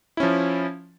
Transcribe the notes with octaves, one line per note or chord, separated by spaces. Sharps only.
F3 C#4 E4